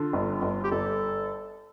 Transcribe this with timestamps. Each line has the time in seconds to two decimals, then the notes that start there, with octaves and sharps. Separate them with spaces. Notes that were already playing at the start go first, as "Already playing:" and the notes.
Already playing: D3 F4
0.13 G1
0.42 G1
0.63 G4
0.71 G1 A4